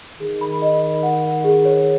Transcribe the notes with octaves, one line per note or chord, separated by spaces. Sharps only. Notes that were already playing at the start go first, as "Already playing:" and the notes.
D#3 G#4
B5
D#5
B5
F#5
F#5
G#4
C#5